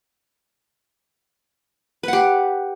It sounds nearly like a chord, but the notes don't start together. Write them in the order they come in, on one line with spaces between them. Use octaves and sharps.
B4 F#5 G4